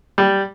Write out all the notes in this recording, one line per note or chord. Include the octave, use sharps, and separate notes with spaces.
G3